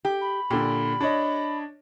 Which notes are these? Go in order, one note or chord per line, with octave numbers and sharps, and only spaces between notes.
G4
B5
A#2 D3 G4
D4 C#5 D#5